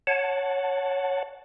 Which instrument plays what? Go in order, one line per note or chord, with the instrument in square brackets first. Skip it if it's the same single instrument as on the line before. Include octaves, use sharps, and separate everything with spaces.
[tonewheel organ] C#5 F#5 A5